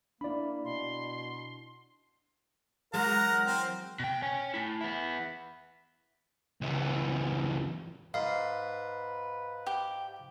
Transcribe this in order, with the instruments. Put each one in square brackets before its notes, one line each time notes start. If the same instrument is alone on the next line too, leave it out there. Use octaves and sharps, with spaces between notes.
[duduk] A#3 [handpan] D4 E4 [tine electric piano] D5 B5
[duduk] B2 [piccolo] C6
[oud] E3 F#3 G#3 [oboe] A#4 [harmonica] F#5 A#5
[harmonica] C4
[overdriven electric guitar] B2 G5
C#5 G#5
A3 E4
B3 E4
[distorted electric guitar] C#2 E3
[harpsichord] G#2 [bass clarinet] B4 [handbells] F5
[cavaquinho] G4